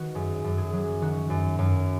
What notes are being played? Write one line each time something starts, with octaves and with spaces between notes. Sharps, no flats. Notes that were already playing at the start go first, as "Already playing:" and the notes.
Already playing: D#3 F#4 B4
F#2 G#4
F#2
G#4
F#3
D#3 F#4
F#2
F#2